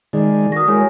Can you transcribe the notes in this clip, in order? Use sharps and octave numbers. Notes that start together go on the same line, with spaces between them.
D#3 G#3 D5
F#4 A#4 D#6 A#6
G#3 E4 F#4 A#4 C#5 G#5